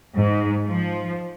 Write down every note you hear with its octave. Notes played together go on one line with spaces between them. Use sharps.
G#2
F3